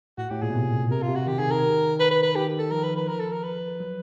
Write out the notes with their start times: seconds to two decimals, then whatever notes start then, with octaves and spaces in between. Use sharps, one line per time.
0.18 A2 F#4
0.30 A2 G4
0.42 A#2 G#4
0.50 B2
0.55 C3
0.91 C3 A#4
1.02 F4
1.09 C3
1.15 F#4
1.26 D#3 G4
1.39 D#3 G#4
1.51 D#3 A#4
2.00 B4
2.11 B4
2.23 B4
2.35 D#3 G4
2.59 A4
2.71 F3 A#4
2.84 B4
2.96 B4
3.08 A#4
3.19 A4
3.32 A#4
3.43 B4
3.80 F#3